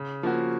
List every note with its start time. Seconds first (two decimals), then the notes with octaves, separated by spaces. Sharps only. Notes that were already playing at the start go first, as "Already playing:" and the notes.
Already playing: C#3
0.23 F3 A#3 C#4 F#4